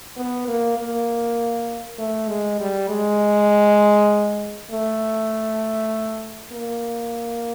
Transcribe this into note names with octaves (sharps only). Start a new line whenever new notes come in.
B3
A#3
A#3
A3
G#3
G3
G#3
A3
A#3